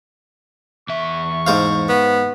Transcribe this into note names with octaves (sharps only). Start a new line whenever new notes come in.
E2 E5 C#6
G#2 C5 F5
B3